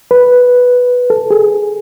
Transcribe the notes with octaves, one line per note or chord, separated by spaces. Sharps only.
B4
A4
G#4